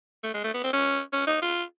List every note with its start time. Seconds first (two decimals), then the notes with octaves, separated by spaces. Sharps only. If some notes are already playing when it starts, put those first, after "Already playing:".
0.23 A3
0.34 G#3
0.44 A3
0.54 B3
0.64 C4
0.73 C#4
1.13 C#4
1.27 D#4
1.42 F4